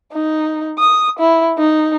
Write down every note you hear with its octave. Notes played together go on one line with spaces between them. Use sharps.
D#4
D#6
E4
D#4